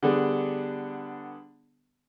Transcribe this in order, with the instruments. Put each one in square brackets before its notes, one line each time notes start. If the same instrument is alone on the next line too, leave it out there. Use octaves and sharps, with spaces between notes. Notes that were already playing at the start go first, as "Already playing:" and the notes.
[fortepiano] D3 G3 B3 D4 G#4